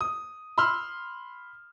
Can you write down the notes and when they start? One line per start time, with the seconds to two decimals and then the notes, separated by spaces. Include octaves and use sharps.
0.01 D#6
0.58 B5 C6 E6 F6